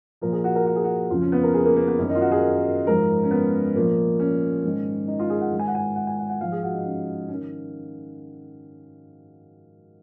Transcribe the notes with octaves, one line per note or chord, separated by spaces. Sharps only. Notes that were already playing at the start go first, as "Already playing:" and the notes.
A#2 F3 A#4
G#4
F#4
A#4
F#4
G#4
F#4
F2 C#3 F3 F4
C#4
B3
A#4
G#4
A#3
A#3
B3
F#2 D#3 C#4
D#4
F4
F#4
G#4
G#2 F3 A#4
C#4
B3
A#2 F3 A#3
C#4
G#2 D#3
D#4
F4
G#4
F#5
G#2 D#3
G#5
F#5
G#5
F#5
G#5
F#5
F#5
G#2 F3 F5
G#4
F#4
D#4
C#4
C#4
D#3